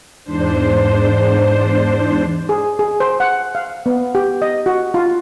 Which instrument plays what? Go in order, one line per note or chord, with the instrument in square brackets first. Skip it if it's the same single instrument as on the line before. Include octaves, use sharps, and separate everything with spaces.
[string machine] E2 G#2 D4 C5
[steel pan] G#4
G#4
C5
F#5
F5
B3
G4
D#5
F#4
F4